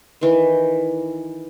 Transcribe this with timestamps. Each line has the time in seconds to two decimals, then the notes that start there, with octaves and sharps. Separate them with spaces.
0.21 D#3 E3